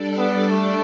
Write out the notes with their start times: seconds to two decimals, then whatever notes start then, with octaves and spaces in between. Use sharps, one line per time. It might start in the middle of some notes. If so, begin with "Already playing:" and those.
Already playing: G3 D4 A4 D5
0.18 B3
0.50 A3